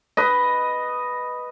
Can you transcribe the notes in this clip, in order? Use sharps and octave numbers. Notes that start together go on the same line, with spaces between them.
B4 D#5